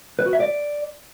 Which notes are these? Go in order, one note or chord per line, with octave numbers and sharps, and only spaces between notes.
B4
F#4
E5
D5